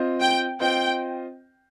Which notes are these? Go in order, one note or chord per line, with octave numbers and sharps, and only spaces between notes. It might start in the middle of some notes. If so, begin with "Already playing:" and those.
Already playing: C4 F4 C5 D#5
G5
C4 F4 C5 D#5 G5